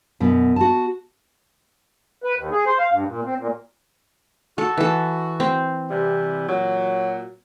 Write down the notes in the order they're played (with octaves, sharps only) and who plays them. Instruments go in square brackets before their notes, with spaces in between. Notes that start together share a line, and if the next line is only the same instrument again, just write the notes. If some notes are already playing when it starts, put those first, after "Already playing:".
[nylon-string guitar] F#2 B2
F#4 A5
[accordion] B4
D#2
G#4
C5
F5
G2
A#2
C4
A#2
[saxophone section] F#4 [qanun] A4
[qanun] E3 A4
C4
[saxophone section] C3 E3 G3
A#2 F#3